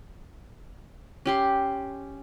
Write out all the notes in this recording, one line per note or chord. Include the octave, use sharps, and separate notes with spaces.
C#4 G4 C6